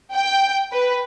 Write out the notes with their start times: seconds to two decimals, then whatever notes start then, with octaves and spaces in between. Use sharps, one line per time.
0.14 G5
0.72 B4